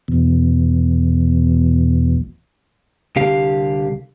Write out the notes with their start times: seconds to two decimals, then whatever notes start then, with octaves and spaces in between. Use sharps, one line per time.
0.08 E2 B2
3.16 C2 D3 G4 F5